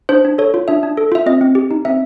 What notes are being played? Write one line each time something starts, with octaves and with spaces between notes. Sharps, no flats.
D4 C5
D4
A4 C#5
F4
D4 E5
D4
A4
F4 E5
C4 D#5
C4
G4
D#4
C4 E5